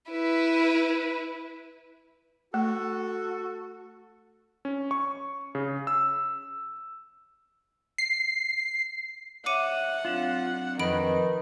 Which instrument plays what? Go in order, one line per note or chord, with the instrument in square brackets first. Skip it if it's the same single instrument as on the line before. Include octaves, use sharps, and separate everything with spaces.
[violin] E4 B4
[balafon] A3 [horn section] F#4 A4
[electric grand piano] C#4
C#6
C#3
E6
[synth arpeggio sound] C7
[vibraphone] C#5 E5 [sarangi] F#5 [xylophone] D6 C#7 D#7
[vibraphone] F#3 C4 D4 [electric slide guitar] F4
[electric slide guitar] F2 [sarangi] D#3 [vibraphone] A#4 B4 D#6 [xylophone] D#5 B5 D7